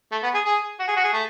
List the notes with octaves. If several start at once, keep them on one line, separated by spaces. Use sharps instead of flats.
A3
B3
G#4
G#4
F#4
G#4
F#4
G#4
A3